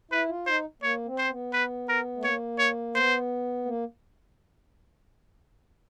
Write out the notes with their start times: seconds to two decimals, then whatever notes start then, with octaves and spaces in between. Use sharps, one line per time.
0.11 E4 B4
0.29 F4
0.46 D#4 C5
0.82 A#3 C#5
1.06 C4
1.18 C5
1.30 B3
1.53 B4
1.89 A#4
2.17 A3
2.24 A#3 C#5
2.59 C#5
2.95 B3 C5
3.66 A#3